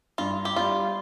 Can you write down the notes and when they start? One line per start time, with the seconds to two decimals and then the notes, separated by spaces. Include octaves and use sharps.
0.18 G2 F4
0.45 G4
0.56 G3 F4